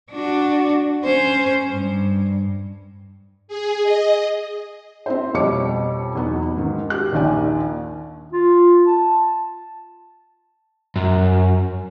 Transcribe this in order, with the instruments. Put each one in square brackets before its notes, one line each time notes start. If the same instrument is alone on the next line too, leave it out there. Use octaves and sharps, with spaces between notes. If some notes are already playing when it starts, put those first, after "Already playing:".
[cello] D4 F#4
C#4 C5
G2
[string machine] G#4
D#5
[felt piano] C4 E4 C5
F2 B2 G3 C#5 D6 C#7
E2 F#3 B3 D#4
G#2 D#3
G4 F#6
A#1 D#2 D#3 D5 G#5
[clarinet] F4
A5
[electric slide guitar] F#2